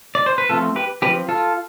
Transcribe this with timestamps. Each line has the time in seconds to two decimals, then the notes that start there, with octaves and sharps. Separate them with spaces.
0.15 D5
0.26 C5
0.38 B4
0.49 F3 A3 C4 F4 A4
0.76 G4 B4
1.02 C4 G4 B4
1.07 F3
1.29 F4 A4